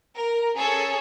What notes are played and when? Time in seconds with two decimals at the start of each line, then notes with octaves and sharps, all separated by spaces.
0.17 A#4
0.57 C#4 G#4 A4 C#5